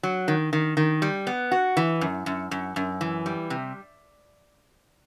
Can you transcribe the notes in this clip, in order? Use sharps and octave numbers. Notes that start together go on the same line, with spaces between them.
F#3
D#3
D#3
D#3
G3
B3
F#4
E3
F#2
F#2
F#2
F#2
E3
G3
C3